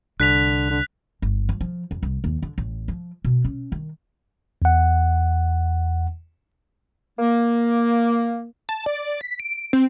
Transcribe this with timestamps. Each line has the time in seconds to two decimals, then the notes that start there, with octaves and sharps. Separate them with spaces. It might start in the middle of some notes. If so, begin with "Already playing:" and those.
0.20 C2 D3 F#6 B6 F7
0.71 D3
1.22 G1
1.49 F3
1.61 F3
1.91 F2
2.03 C2
2.24 D#2
2.42 D3
2.58 A1
2.88 F3
3.24 B2
3.45 C#4
3.72 D#3
4.62 E2 F#5
7.19 A#3
8.69 A5
8.86 D5
9.21 B6
9.40 D7
9.73 C4